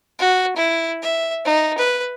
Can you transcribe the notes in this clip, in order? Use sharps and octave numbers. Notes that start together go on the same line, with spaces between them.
F#4
E4
E5
D#4
B4